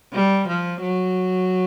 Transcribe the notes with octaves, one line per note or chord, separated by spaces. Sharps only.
G3
F3
F#3